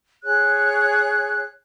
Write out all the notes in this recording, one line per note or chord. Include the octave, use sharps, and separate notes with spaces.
G#4 C#5 F#6